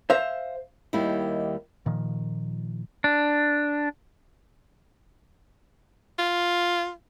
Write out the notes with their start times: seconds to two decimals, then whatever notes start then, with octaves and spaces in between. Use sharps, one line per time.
0.10 C5 E5 F5
0.93 D#2 D#3 G3 E4
1.86 A#2 D#3 F3
3.04 D4
6.19 F4